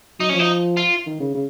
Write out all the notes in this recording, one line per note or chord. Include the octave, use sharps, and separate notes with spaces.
F#3 D#4
C#4
F3 D#4
F4
D#3
C#3
C#3